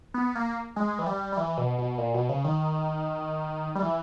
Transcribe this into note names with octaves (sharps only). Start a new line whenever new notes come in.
B3
A#3
G#3
E3
G3
G3
E3
B2
B2
A#2
B2
C#3
D#3
G3
E3